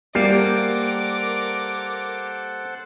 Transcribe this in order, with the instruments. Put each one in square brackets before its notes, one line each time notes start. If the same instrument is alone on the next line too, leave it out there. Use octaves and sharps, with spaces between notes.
[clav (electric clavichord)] G3 [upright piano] A#3 C7 [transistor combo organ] A4 C5 F#5 [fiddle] A#4 D6